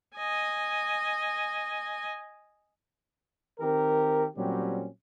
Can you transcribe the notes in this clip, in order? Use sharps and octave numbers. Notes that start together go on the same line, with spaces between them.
D#5 G#5
D#3 C4 G4 A#4
A#2 F#3 G3 C4 C#4 G4